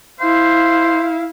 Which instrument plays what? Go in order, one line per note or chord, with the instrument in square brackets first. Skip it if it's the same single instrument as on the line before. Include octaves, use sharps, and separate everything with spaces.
[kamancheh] E4 F5 [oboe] C5